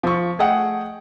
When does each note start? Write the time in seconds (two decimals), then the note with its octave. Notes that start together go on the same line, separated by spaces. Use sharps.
0.03 F3 C#6
0.39 A3 G#4 D#5 F#5 G5